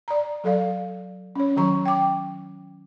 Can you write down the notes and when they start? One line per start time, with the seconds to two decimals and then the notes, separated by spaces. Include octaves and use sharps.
0.08 D5 A#5
0.44 F#3 A4 D5 F5
1.36 C#4 C#5
1.56 D#3 F#3 A#5 C#6
1.85 G5 D6